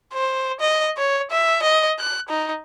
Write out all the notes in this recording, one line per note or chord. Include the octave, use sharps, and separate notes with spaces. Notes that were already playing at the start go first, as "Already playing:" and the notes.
C5
D#5
C#5
E5
D#5
F#6
D#4